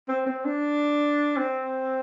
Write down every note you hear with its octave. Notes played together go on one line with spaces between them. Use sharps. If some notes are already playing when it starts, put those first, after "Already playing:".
C4
C4
D4
C4